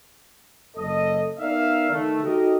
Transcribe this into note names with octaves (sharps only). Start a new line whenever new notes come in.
F#1 A4 D#5
B3 D#4 A#4 D5 E5 F5
D#3 A3
D#4 F#4 G4 A4 A#4 D#5